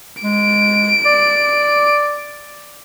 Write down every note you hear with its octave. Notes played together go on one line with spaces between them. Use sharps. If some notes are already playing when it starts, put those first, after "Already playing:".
G#3 D7
D5